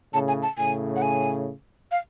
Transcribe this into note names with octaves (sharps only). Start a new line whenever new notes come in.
A2 C#3 A5
G#5
A5
A2 C#3 G#5
F#5
G#5
F5